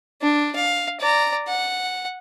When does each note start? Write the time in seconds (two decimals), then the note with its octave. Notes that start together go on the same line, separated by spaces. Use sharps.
0.22 D4
0.55 F5
1.00 D5 A#5
1.48 F#5